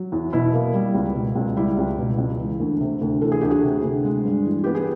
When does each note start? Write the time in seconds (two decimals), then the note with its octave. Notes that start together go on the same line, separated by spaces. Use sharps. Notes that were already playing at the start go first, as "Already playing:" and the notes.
Already playing: F#3
0.12 E2
0.33 B2 E4
0.54 A#3
0.74 G3
0.94 C#2
1.16 B2
1.35 C#2
1.57 G3 E4
1.77 C#2
1.98 B2
2.18 C#2
2.39 E3
2.60 D2
2.80 C3
3.01 D2
3.21 E3 A4
3.32 G#4
3.41 D2 G4
3.50 F#4 G#4
3.63 C3
3.83 D2
4.05 G#3
4.25 G2
4.45 E3
4.64 B3 G4
4.75 G#4